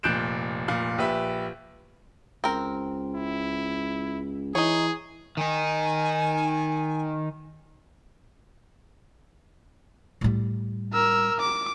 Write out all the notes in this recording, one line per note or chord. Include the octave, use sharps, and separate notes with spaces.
F1 A#2 F#6 G6 D7 E7
F1 A#2 F5
A#1 G4 B4 E5
C#2 C4 A#4
E4
E3 D#4 G#4 C#5
D#3 D#4 G#5
A2 G3
A#4 E6
D6